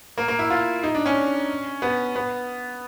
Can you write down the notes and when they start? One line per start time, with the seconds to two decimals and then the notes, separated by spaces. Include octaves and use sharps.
0.18 A#3
0.28 A#3
0.39 E4
0.50 F4
0.83 D#4
0.95 D4
1.06 C#4
1.82 B3
2.16 B3